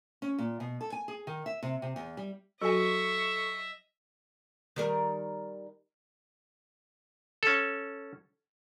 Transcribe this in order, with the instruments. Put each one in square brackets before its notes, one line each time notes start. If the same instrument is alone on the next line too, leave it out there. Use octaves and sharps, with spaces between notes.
[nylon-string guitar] C#4
A#2
B2
A4
G#5
G#4
D#3
E5
C3
C3
E2
G3
[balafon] F#3 F#4 [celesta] A4 G#5 [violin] D#5 E5 [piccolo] C#6
[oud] D#3 G3 A#4
[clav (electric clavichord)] C#4 A4